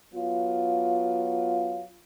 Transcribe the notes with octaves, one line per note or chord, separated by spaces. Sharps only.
F#3 B3 F4